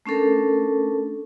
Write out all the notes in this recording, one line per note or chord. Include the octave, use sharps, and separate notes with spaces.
A3 C#4 D4 A4 A#4